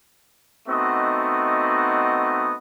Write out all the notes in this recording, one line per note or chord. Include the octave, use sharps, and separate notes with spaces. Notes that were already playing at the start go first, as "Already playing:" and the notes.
A3 B3 C4 D#4 F#4 D#5